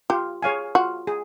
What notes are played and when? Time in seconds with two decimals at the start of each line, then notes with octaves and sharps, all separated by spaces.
0.10 F4 G4
0.42 G#4 C#5 F5 G#5
0.75 F4 F#4
1.07 G#4